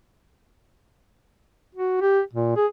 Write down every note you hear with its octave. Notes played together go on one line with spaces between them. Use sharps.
F#4
G4
A#2
G#4